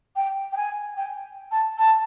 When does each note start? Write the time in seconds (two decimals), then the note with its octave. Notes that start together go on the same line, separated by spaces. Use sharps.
0.16 G5
0.53 G5
0.57 G#5
0.97 G5
1.51 A5
1.79 A5